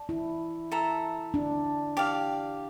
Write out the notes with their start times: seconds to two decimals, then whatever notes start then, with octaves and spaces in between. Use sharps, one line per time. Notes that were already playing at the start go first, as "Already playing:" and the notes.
Already playing: D5 A5
0.09 E4
0.72 A4 E5 A#5
1.34 D4
1.97 G4 D5 F5